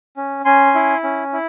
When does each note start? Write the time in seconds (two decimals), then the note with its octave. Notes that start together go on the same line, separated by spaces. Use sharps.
0.17 C#4
0.45 C#4 G#5 C6
0.75 E4
1.03 C#4
1.33 E4